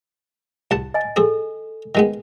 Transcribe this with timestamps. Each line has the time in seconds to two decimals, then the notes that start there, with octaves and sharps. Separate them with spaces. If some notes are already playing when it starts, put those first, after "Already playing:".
0.71 C2 F#5 A5
0.94 D#5 G#5
1.16 C4 G#4 A4
1.95 D#3 G#3 B3